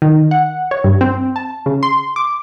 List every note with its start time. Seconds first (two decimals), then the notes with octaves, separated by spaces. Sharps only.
0.02 D#3
0.31 F#5
0.71 C#5
0.84 G2
1.01 C4
1.36 A5
1.66 C#3
1.83 C6
2.16 D6